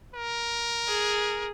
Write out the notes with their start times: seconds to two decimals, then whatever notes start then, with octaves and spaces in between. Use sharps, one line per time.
0.14 A#4
0.88 G#4